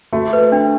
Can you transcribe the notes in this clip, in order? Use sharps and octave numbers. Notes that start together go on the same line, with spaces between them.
A3 F#4
B4
D4